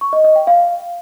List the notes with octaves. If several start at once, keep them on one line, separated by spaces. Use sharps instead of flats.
C#6
D#5
D#5
G5
F5